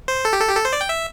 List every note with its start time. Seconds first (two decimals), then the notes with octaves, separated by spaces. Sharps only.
0.08 C5
0.25 A4
0.33 G4
0.41 A4
0.49 G4
0.57 A4
0.65 C5
0.73 D5
0.81 G5
0.89 E5